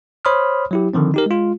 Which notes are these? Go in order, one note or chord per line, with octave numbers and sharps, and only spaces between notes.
C5 C#5 B5 C6 D#6 F6
F#3 E4 G4
D3 D#3 F3 C4
D#4 G4 A#4
G#3 F4